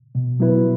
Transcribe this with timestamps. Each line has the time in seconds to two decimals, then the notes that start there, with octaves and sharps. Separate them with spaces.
0.15 B2
0.40 F#3 B3 E4 B4